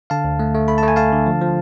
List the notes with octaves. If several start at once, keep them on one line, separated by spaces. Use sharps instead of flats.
D3 F5 A5
D2
A3
A3
A3 B5
A5
A3
G#5
A3 F5 A5
D3
F3
F3